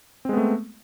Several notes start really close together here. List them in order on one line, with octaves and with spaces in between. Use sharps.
C4 G#3 B3 A3